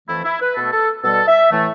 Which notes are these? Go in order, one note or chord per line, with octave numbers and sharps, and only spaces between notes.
F2 E3 A3 E4
E4
B4
B2 A3 A4
A4
B2 G3 A4
E5
A2 E3 A3